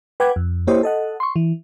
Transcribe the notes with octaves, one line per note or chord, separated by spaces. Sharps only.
B4 F#5 G5 D6 G#6
F2
A#3 E4 G4 C5 C#5 D#5
A4 D#5 F#5
C6 C#6
E3